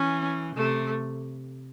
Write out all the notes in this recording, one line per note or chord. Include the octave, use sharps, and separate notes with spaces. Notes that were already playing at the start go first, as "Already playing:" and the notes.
Already playing: E3 C#4
C3 A3